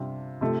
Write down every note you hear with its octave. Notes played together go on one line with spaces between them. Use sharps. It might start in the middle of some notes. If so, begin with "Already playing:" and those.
Already playing: C3 G3 D4 F4
C3 F3 A3